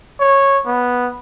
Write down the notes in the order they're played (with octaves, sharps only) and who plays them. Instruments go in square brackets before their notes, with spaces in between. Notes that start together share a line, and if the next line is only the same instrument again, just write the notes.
[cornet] C#5
B3